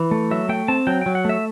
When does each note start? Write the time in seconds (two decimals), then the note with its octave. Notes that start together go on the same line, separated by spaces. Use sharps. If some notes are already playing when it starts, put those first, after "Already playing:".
Already playing: E3
0.11 A3
0.31 F#3 E5
0.49 A3 G5
0.68 C4 A5
0.87 F#3 G5
1.01 F#3 G5
1.15 F#5
1.25 A3 E5